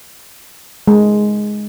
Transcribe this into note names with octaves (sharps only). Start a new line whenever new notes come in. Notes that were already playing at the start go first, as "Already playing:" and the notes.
G#3